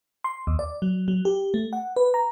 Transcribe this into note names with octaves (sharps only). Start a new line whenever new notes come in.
C6
D#2
D5
F#3
F#3
G4
A3
F#5
B4
A#5